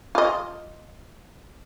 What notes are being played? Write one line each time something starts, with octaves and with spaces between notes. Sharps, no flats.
F4 D#5